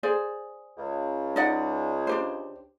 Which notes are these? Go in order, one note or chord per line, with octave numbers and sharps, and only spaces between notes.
G#4 C5 D5
C#2
D#4 D5 F#5
D4 G4 C5